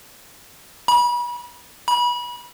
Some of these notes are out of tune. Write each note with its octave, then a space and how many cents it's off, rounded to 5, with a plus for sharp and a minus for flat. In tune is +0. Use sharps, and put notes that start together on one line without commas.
B5 -35
B5 -30